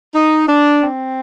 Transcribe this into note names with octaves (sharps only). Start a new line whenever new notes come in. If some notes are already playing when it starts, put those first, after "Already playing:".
D#4
D4
C4